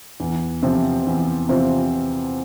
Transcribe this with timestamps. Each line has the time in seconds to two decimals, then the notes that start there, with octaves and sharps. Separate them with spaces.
0.20 E2
0.63 C3 F3 C4 F4
1.07 E2
1.49 C3 F3 C4 F4